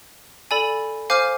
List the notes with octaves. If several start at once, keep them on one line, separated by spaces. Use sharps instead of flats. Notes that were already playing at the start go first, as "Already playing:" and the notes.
A4 D5 G#5 B5
C5 F5 G#5 D6 F6